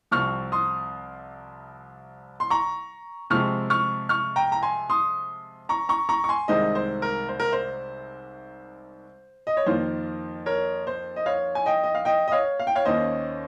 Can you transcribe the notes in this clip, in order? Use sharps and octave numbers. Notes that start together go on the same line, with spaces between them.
C2 C3 F3 C4 C#6 F6
C6 D#6
C6
A#5 C#6
C3 F3 G#3 C4 C#6 F6
C#6 F6
C#6 F6
G5 A#5
A#5
G#5 C6
C6 D#6
A#5 C#6
A#5 C#6
A#5 C#6
C#6
G#5 C6
C2 C3 D#3 G#3 C5 D#5
C5
A#4
C5
A#4
C5
D#5
C#5
F2 D#3 A#3 F4 C5
A#4 C#5
C5
D#5
C#5 F5
G#5
D#5 G5
D#5
F5
D#5 G5
D#5
C#5 F5
F5
G5
C#5 F5
D#2 D#3 A#3 C#4 C5 D#5